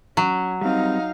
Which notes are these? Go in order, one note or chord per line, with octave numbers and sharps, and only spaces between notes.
F#3 C#4
G3 C4 D#4 F5